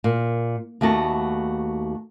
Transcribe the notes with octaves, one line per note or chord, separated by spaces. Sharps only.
A#2
D#2 A3 B3 F#4 A5